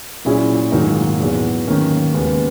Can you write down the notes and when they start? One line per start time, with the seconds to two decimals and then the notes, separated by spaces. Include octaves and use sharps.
0.25 A#2 F#3 C#4 E4 G#4
0.72 G#2 D#3 F#3 A#3 D#4
1.20 E2 B2 F#3
1.67 D#3 F#3 A#3 C#4
2.14 D#2 C#3 G#3 B3